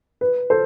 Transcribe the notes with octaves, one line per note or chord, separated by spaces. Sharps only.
B4
A4 C5